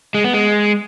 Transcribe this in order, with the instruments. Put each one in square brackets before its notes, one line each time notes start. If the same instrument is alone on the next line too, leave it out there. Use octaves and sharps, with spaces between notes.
[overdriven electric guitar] G#3
B3
G#3